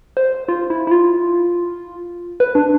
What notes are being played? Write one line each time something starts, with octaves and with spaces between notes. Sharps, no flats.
C5
F4
E4
E4
F4
B4
D4